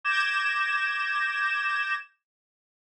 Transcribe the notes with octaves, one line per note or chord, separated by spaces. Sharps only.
D6 G6 G#6 A#6 E7